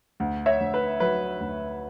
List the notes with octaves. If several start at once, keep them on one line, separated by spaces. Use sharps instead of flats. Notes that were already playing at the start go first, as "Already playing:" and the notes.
D2
C#5 E5
D2
B4
F#3 B4
D2